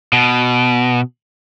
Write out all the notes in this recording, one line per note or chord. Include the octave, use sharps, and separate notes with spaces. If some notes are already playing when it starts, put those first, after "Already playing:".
B2